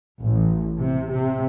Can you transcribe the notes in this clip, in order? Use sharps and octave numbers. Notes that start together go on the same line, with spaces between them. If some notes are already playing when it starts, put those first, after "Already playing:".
A1
C3
C3